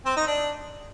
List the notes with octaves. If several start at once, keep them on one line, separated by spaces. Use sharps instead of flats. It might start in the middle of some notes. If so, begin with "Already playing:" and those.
C4
D#4
D4